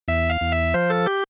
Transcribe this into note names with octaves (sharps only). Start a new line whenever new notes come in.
E2 E5
F5
E2
E5
F3 C5
A4
G4